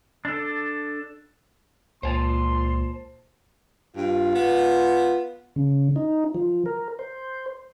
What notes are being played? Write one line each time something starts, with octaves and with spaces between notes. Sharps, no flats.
D4 A4
C#2 A#2 C5 G#5 A5 C6
G2 F4
B3
C#3
D#4
F3
A#4
C5